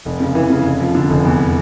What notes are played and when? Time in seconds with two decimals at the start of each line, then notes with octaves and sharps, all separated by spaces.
0.05 F1
0.20 C#3
0.35 E3
0.50 C#3
0.65 F1
0.81 F3
0.95 D3
1.10 F1
1.25 E2